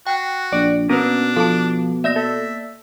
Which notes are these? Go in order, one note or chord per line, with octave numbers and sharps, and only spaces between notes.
F#4 G5 F#6
A#1 D5
B2 A#3 C#4 D4 B4
F3 A4 A5
A#3 D5 E5 A#6
A4 E5